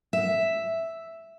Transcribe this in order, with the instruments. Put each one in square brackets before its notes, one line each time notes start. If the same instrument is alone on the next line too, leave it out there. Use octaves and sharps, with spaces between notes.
[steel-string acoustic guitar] E5